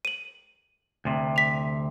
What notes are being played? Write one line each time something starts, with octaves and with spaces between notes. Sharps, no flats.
D#7 F#7
D2 C3
B6 F7